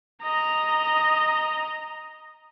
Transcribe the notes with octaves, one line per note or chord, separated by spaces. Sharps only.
D#5 A#5